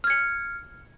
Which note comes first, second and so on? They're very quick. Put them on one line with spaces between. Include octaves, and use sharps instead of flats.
F6 G#6 C#7